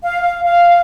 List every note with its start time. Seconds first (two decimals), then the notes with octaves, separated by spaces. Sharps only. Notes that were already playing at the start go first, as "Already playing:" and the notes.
0.04 F5
0.22 F5
0.44 F5